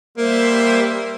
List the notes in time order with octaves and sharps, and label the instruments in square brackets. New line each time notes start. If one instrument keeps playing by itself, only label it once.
[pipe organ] G3 C5 E5 [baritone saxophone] A#3